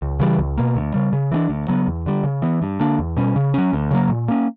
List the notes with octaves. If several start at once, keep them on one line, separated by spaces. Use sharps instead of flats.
C#2
C#3 E3 G3
C#2
B2 A#3
D2
C#3 G3
C#3
E3 B3 D4
D2
C#3 F#3 B3
E2
D3 G3
C#3
E3 B3
G2
D3 A#3 D4
E2
B2 G3 C#4
C#3
F#3 C#4
D2
C#3 F#3 A#3
A#2
A#3 C#4